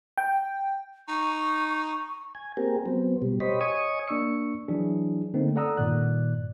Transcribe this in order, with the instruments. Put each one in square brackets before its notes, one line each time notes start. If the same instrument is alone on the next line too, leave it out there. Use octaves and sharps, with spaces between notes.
[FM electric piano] G5
[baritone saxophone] D#4 [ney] C#6
[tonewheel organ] G#5
A#3 C4 G4 G#4 A#4
F#3 B3 C4
B2 G3
G4 C5 C#5 D#5 B5
C#5 D#5 G#5 C#6 D#6
[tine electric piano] A#3 D4 D5 C#6 E6 C#7
E3 F#3 D4 E4 G#4
D3 A3 A#3 C4 D#4
A4 D5 F#5 A#5 D#6 E6
G2 A#2 D#3 D5 F#6